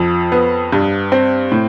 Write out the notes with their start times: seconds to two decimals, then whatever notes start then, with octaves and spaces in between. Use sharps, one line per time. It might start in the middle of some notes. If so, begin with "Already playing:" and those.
Already playing: F2 F3
0.32 B3
0.73 G2
1.12 C4
1.52 A2